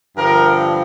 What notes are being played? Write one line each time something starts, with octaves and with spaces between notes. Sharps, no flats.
G2 D3 F3 A#4